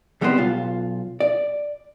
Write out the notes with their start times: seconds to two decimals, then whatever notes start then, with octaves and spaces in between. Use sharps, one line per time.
0.21 C#2 G3 B3 C4 A4 C5
0.38 B1 F4
1.20 D5